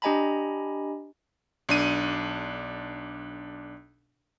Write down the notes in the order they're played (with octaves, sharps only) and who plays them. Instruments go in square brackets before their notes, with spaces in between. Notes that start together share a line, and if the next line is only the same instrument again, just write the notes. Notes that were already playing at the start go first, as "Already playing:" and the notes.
[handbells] D4 G4 D#5 G#5 A#5 B5
[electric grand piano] B1 D4 D#7